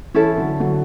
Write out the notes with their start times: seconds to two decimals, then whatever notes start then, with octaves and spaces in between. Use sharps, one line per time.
0.14 E3 C#4 E4 A4
0.37 D3 F#3
0.60 D3 F#3